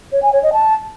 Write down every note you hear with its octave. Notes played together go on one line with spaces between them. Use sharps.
C#5
G#5
C#5
D#5
A5